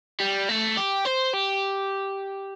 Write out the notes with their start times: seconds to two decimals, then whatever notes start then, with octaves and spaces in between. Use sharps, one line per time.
0.20 G3
0.49 A3
0.77 G4
1.05 C5
1.34 G4